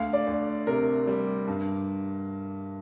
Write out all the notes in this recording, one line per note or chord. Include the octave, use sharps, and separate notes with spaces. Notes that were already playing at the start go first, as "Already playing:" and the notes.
Already playing: D2 F5
D5
D2
C3 A#4
G3
G2